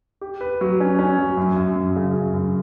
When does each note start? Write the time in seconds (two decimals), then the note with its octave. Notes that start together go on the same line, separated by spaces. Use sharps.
0.21 G4
0.41 B4
0.61 F#3
0.80 C#4
0.99 C#4
1.18 F#3
1.37 F#2
1.56 F#2
1.76 F#2
1.96 C#3
2.15 F#2
2.33 F#2